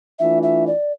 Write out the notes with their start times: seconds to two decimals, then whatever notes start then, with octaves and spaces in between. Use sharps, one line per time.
0.19 E3 A3 D4 F4 E5
0.43 E5
0.67 D5